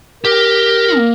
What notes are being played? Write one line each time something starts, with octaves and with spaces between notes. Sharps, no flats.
G4 A#4
A#3